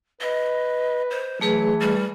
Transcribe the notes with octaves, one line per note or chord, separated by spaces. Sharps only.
B4 D#5
C5
E3 F#3 A3 G#4 B4
G3